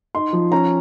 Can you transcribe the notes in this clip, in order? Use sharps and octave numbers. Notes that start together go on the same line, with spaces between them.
D#4 C6
F3
C#4 A#5